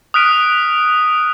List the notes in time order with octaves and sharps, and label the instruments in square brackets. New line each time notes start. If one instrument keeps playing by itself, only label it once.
[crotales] D#6 F6 F#6 B6 D7 D#7